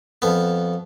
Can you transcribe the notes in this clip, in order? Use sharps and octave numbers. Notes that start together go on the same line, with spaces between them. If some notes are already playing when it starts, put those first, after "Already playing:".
F2 B3